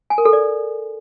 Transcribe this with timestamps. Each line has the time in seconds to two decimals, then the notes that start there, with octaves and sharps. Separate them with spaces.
0.10 G#5
0.18 A#4
0.25 A4
0.33 D5